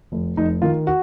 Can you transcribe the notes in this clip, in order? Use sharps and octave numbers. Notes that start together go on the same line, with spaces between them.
F1
F1 D#4
D#3 F4
F#4